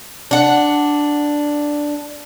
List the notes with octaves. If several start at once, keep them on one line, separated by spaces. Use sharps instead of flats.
D4 F#5